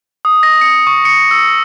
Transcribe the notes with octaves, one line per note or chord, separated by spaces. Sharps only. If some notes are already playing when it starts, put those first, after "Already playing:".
D#6
A#6
C#7
C#6
C#7
E6